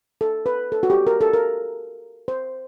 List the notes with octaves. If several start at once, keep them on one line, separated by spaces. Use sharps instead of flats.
A4
B4
A4
F#4
G4
A#4
A4
A#4
C5